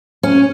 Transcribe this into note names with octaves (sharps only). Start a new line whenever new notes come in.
C#4